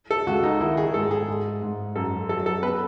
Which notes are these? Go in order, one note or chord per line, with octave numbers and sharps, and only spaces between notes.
A4
C#2 F#4
D#4
D#3 E4
G#4
G#2 A4
G#4
G#2
G#2
F#2 A4
F#3 A4
A4
B3 B4